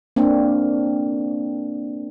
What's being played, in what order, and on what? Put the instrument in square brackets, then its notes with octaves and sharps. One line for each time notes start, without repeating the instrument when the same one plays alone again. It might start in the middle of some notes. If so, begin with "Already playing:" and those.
[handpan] A#3 C4 D4